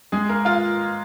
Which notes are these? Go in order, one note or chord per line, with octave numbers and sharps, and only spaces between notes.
G#3 G#4
A#3 A#4
F4 F5